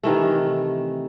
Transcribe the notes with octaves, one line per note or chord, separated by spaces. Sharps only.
C3 D#3 E3 A3